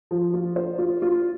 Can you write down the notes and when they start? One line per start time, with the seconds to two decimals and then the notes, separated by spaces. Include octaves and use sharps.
0.11 F3
0.34 F4
0.56 C5
0.79 F4
1.02 F4